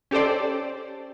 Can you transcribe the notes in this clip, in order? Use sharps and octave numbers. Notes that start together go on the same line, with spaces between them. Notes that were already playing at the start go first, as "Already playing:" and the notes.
C#4 G4 A4 C5 D5